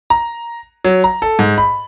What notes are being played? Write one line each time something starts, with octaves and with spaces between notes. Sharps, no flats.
A#5
F#3
A#5
A4
G#2
B5